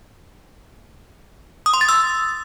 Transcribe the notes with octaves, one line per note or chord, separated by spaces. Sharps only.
D#6
C6
A6
E6